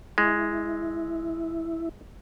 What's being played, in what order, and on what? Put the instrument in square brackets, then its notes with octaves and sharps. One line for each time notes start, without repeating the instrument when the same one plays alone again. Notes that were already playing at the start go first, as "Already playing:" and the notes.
[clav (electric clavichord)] G#3 [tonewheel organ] E4